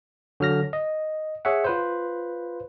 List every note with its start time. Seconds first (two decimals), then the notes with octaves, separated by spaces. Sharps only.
0.40 D3 F#3 F6 A#6
0.73 D#5
1.45 G#4 C#5 E5 F#5
1.64 F4 B4 C5